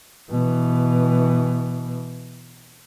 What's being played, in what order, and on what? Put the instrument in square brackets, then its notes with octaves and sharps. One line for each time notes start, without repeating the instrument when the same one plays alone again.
[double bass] B2 E3